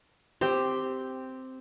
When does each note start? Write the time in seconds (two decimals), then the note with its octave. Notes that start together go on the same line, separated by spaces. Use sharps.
0.41 C4 G4